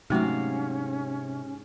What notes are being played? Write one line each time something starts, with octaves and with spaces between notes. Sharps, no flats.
G#2 C3 F#3 A3 C#4 F#4 F5